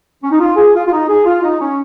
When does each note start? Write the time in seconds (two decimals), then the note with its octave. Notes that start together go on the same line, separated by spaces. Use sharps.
0.23 C#4
0.31 D#4
0.40 F4
0.56 G#4
0.75 F4
0.87 F4
0.92 D#4
1.08 G#4
1.25 F4
1.43 D#4
1.61 C#4